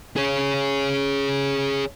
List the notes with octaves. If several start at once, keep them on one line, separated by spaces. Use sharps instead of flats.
G#4 C#5